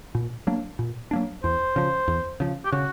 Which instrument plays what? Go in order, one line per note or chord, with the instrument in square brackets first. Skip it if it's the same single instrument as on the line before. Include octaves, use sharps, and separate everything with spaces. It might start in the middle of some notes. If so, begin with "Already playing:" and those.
[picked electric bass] A#2
F#3 A#3 D4
A#2
F#3 A#3 D4
[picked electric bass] E2 [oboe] C5
[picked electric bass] C#3 F3
E2
C#3 F3
[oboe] G4
[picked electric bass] C#3 [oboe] F#4